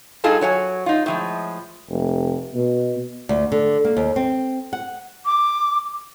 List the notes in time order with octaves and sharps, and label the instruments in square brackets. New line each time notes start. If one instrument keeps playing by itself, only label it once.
[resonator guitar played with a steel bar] G2 D#4 F4 G#4 A4 A5
F#3 C#5 F#5 G#5
D#4 F4
A2 F3 G#3
[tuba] F1
B2
[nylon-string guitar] D2
D3
A#3
D#2
C4
F#5
[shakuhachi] D6